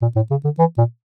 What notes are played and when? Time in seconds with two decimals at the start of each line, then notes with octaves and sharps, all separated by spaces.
0.02 A#2
0.16 A2
0.31 C#3
0.44 D3
0.58 E3
0.78 A#2